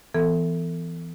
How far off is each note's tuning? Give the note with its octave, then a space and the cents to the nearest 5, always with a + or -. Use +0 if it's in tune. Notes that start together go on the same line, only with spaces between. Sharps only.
E3 +10 B3 +25 A4 +15